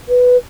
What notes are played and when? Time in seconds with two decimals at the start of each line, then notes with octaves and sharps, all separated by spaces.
0.09 B4